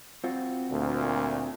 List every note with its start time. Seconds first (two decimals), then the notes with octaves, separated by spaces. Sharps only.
0.24 C4 F4 F#4
0.70 D2 A#2